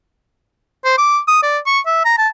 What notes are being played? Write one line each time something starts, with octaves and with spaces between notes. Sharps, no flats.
C5
D6
D#6
D5
C#6
E5
A#5
A5